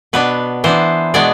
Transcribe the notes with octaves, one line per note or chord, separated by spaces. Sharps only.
B2 B3 D4 B4
E3 B3 D4 C5
B2 G#3 B3 D4 D5